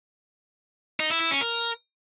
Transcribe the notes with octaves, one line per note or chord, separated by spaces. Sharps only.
D#4
E4
E4
C#4
A#4